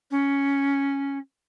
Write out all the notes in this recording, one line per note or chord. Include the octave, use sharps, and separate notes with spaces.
C#4